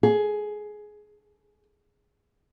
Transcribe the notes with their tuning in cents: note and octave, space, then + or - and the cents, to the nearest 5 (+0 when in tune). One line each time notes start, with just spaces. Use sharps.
G#4 +15